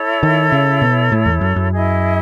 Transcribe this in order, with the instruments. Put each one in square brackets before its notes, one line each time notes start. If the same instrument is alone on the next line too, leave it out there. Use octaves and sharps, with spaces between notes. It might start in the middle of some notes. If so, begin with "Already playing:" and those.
Already playing: [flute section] E4 A4 C#5
[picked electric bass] D#3
C#3
B2
A2
E2
F#2
F#2
[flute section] E4 G#4 D#5